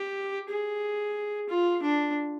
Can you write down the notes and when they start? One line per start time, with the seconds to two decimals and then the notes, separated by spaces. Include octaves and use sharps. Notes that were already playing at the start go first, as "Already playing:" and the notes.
Already playing: G4
0.49 G#4
1.49 F4
1.83 D4